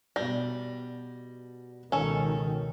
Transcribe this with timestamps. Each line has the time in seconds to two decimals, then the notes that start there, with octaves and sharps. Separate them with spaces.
0.16 B2 G3 A#6
1.92 C#2 B2 D#3 C#4 A4